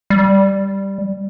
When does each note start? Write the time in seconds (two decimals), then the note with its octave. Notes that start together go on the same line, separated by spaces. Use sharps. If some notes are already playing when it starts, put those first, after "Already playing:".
0.10 G3